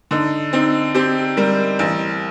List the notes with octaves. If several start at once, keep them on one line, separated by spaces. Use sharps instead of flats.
D3 D#4
C4 D#4
C4 G4
G3 A#4
A1